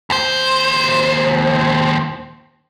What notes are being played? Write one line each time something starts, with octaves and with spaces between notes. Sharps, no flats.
D#2 C5